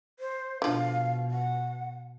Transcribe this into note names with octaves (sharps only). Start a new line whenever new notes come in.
C5
B2 D3 F3 F5
F#5